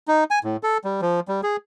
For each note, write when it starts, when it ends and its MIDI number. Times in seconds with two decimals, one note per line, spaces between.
0.08 0.24 63
0.31 0.39 80
0.44 0.57 45
0.63 0.78 69
0.84 1.01 55
1.02 1.20 53
1.28 1.41 55
1.43 1.56 68